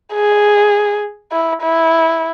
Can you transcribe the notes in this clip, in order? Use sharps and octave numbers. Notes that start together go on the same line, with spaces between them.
G#4
E4
E4